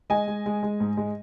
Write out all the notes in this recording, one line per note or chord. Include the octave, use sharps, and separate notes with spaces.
G#3 D#5 G#5
G#3
G#3
G#3
G#2
G#3